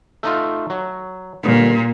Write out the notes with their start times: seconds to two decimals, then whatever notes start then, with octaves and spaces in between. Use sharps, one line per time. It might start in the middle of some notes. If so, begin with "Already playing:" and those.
0.23 A3 D#4 F4
0.70 F#3
1.44 G1 A#2